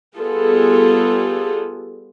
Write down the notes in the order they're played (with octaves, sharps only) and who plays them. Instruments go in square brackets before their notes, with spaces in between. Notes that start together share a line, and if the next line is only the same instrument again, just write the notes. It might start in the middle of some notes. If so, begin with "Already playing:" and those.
[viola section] G3 B3 F4 G#4 A4